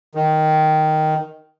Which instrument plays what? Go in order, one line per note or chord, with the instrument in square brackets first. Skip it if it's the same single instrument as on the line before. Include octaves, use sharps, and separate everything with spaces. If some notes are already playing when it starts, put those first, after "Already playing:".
[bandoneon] D#3